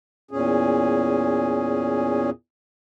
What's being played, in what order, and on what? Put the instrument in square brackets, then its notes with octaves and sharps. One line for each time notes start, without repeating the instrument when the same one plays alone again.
[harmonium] E2 A#2 C#4 G#4